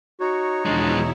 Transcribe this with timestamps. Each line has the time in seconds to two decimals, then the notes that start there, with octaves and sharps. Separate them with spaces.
0.20 D#4 F#4 C#5
0.65 E2 B2 F3 G#3 D4 E4